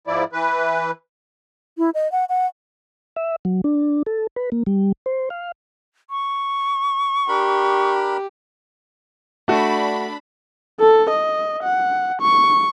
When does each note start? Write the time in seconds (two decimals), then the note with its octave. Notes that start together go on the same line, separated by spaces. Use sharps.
0.07 G#2 F3 E4 D5
0.33 E3 B4
1.78 E4
1.94 D#5
2.12 F#5
2.29 F#5
3.16 E5
3.45 F#3
3.64 D4
4.06 A4
4.36 B4
4.52 A#3
4.66 G3
5.06 C5
5.30 F5
6.10 C#6
7.28 D4 G4 A#4 B5
9.48 A3 D4 F#4 B5
10.80 A4
11.11 D#5
11.63 F#5
12.21 C#6